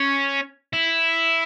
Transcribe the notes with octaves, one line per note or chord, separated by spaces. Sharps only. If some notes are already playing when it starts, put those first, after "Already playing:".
Already playing: C#4
E4